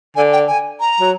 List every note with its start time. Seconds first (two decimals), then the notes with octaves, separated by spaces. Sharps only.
0.16 D3 G#5
0.32 G5
0.48 G#5
0.80 A#5
1.01 F#3